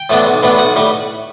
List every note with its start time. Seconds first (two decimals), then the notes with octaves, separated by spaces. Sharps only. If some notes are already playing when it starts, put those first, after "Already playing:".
Already playing: G5
0.10 A2 E3 B3 D4
0.27 B1
0.43 A2 E3 B3 D4
0.59 B1 F#5
0.76 A2 G3